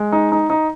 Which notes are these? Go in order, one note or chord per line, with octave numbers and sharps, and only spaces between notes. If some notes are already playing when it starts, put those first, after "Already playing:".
Already playing: G#3
D#4
D#4
D#4